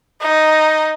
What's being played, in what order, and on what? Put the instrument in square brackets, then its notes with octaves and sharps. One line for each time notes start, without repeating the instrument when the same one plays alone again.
[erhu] D#4